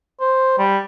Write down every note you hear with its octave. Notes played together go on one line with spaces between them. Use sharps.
C5
G3